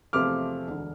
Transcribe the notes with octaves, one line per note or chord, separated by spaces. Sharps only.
E2 C3 F3 A3 D6 F6
E1 D2 D3